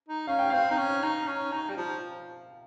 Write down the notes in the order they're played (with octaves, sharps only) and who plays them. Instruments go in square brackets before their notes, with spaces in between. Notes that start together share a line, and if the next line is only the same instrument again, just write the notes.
[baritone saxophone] D#4
[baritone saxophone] C#4 [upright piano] F5
[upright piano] G5
[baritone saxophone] C4 [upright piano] F5
[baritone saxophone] D#4
C#4
D#4
C#4
D#4
G3
F3